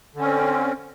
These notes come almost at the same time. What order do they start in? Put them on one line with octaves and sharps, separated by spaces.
D3 C#4 C4